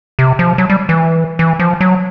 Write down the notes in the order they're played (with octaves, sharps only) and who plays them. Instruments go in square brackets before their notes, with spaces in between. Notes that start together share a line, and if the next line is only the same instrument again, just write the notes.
[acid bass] C3
F3
F#3
G3
E3
E3
F3
F#3